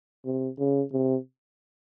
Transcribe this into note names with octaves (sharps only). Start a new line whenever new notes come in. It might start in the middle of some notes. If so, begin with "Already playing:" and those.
C3
C#3
C3